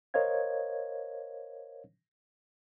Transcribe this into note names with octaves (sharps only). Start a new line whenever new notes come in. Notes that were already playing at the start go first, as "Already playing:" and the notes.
A#4 C5 C#5 D#5 F5 G#6